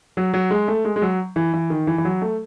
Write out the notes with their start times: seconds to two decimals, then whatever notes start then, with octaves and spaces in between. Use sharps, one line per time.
0.17 F#3
0.34 F#3
0.51 G#3
0.68 A3
0.85 G#3
0.96 G#3
1.02 F#3
1.36 E3
1.54 E3
1.70 D#3
1.87 E3
1.98 E3
2.05 F#3
2.22 A3